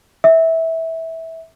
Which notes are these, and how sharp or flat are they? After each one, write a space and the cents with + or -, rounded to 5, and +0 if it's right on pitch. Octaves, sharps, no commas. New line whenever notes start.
E5 -15